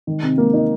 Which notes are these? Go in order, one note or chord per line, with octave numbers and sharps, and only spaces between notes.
D#3
C3
A#3
D#4